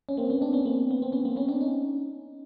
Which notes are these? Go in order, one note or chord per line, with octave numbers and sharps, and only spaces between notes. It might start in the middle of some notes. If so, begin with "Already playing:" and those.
C#4
A#3 C4
B3 C#4
C4 D4
B3 C#4
A#3 C4
B3
C4
B3 C#4
A#3 C4
B3 C#4
C4 D4
C#4 D#4